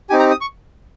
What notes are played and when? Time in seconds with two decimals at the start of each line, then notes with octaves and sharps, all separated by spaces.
0.10 C4 D#4 G4 G#5
0.19 A#5
0.31 D#6
0.41 C#6